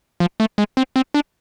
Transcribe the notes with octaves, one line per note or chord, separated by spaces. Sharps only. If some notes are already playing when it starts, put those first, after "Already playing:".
F3
A3
G#3
C4
C4
D4